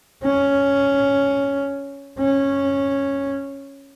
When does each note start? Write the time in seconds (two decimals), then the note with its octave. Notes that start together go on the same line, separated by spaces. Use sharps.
0.23 C#4
2.19 C#4